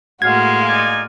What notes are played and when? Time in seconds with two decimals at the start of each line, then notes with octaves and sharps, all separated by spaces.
0.22 A2 G#3 A#3 F#4 F5 G#6
0.66 D#4 D5 F5 G#5